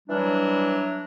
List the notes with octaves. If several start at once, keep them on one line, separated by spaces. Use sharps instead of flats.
E3 F#3 G3 D4